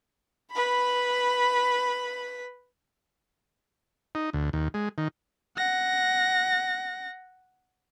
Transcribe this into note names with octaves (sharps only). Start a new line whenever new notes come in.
B4 B5
D#4
D2
D#2
G#3
D#3
F#5 A#6